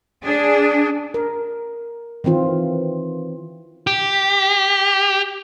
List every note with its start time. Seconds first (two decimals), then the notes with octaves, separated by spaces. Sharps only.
0.23 D4 G#4
1.14 A#4
2.24 D#3 E3 C4 F4
3.87 G4